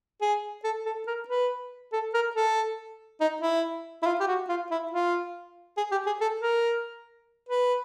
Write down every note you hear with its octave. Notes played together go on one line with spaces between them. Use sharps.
G#4
A4
A4
A#4
B4
A4
A#4
A4
D#4
E4
E4
F4
G4
F#4
F4
E4
F4
G#4
G4
G#4
A4
A#4
B4